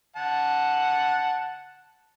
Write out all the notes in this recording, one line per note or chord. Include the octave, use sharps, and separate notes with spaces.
F#5 A5